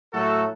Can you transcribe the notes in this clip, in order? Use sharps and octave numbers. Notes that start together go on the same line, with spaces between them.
A2 F#3 A3 F#4 A4